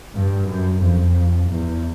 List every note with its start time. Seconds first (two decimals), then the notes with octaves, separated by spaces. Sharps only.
0.14 G2
0.49 F#2
0.83 F2
1.52 E2